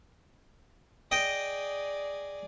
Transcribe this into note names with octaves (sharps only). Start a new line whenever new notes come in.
G#4 D5 D#5 G5